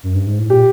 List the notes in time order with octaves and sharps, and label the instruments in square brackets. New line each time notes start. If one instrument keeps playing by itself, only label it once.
[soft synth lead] F#2
G2
G#2
A2
[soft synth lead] A#2 [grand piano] G4